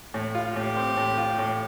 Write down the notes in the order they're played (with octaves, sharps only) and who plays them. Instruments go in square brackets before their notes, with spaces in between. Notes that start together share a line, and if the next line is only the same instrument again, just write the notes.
[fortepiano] A2
F4
[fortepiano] A2 [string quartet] G4
[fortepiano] C4
A2
F4
A2